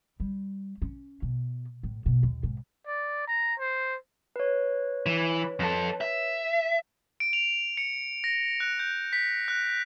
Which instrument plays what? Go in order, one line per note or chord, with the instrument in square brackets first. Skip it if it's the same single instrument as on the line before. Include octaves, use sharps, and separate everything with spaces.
[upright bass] G3
C#4
B2
A2
B2
D#2
G#2
[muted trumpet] D5
A#5
C5
[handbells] B4 C#5
[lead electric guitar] E3
F2 A4
E5
[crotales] D7
F7
C#7
A#6
F#6
G6
B6
F#6